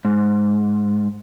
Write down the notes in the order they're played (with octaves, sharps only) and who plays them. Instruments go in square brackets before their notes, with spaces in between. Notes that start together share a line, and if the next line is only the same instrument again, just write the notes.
[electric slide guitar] G#2